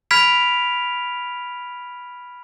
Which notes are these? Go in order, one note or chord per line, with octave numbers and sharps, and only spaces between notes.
B5 F6 G#6 B6 D7 F7